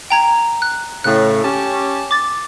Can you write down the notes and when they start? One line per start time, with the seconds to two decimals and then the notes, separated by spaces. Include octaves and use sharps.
0.10 G5 A#5 G#6
0.62 F#6
1.04 A2 C#3 F#6
1.43 C#4 G4 A5
2.11 D6 A6